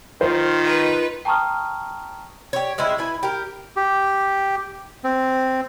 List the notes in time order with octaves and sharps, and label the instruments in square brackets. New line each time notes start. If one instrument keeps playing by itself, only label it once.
[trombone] D#3 [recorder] F4 [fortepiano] C5
[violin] D#4 B4
[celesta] G5 A5 A#5 C#6 D#6 F6
[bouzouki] G4 C#5
C#3 G#3 C4 E4
E4 B4 G#5
G4 A#4
[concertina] G4
C4